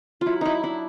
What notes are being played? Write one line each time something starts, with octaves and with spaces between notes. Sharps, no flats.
F#3 E4 F4
D#4 E4
D4 E4